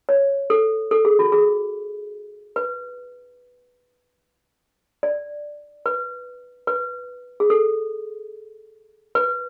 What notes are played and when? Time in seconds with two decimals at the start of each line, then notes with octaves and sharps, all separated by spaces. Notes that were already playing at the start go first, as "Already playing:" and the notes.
0.09 C#5
0.50 A4
0.91 A4
1.05 G#4
1.19 F#4
1.32 G#4
2.56 B4
5.03 D5
5.86 B4
6.67 B4
7.40 G#4
7.50 A4
9.15 B4